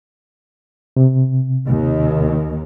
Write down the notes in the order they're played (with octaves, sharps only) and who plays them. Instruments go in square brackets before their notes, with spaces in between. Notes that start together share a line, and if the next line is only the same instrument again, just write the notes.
[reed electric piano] C3
[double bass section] D#2 D#3